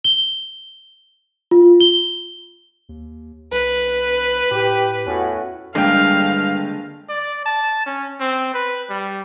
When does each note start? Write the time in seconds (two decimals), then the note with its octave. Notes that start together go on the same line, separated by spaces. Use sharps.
0.04 G7
1.51 F4
1.80 G7
2.89 D#2
3.52 B1 B4
4.51 A2 G4
5.06 E2 A2 C#4 F#4
5.75 F#1 G2 D3 G#3 A#3 F5 G5
7.09 D5
7.46 A5
7.86 C#4
8.20 C4
8.54 B4
8.89 G3